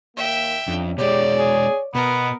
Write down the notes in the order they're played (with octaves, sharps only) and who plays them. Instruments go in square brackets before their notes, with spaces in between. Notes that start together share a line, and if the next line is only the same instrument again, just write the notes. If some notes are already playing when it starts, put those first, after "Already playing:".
[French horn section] D#2 A#3 [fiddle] E5 G5
[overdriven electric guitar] F2 [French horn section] C#4 D4
[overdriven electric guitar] B2 G#3 [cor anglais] G4 [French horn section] C#5 [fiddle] D5
[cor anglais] G#4
[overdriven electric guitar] B2 [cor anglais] B3 [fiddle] A#4